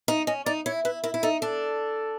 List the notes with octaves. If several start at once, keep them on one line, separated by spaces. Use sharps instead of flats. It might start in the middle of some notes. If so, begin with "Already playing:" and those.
D#4
C#4 D#5
D#4 D5
E4 C#5
E4 B4
E4 A#4
E4
D#4 A4
D4 A4